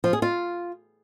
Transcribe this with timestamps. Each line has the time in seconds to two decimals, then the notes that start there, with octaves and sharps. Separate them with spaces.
0.04 F3
0.13 G#4
0.22 F4